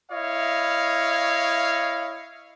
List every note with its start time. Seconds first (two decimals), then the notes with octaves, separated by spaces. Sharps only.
0.11 E4 C#5 D#5 F5